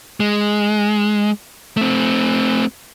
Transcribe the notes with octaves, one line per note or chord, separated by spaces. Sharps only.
G#3
A3 C4